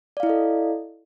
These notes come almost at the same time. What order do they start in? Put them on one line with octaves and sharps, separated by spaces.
D5 F5 E4 D#5 A4